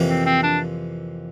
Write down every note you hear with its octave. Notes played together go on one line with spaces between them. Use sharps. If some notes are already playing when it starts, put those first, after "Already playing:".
Already playing: F2 C3 E3 A#3
C4
C4
D4